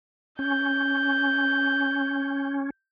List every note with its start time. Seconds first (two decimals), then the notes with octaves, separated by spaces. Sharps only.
0.39 C#4 G6